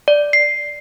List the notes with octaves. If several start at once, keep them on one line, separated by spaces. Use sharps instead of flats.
D5
C7